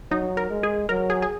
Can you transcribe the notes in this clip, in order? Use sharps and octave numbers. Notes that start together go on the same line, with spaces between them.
F#3 D#4
A#4
G#3
G#4
F#3 A#4
G#4
G#4